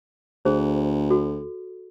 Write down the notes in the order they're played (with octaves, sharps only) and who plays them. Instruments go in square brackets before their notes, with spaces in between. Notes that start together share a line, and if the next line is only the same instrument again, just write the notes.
[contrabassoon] D2 [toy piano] G#4 C5
[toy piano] F#4 A4